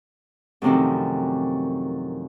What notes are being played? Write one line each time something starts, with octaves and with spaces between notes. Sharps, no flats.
F#2 A2 C3 D#3 F3